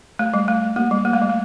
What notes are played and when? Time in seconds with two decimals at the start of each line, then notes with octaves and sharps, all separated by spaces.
0.19 A3
0.34 G3
0.48 A3
0.76 A#3
0.91 G3
1.05 A#3
1.13 A3
1.22 G3
1.30 A3